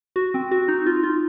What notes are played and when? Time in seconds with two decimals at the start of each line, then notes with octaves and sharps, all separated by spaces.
0.16 F#4
0.34 C4
0.51 F#4
0.68 D#4
0.86 F4
1.03 F4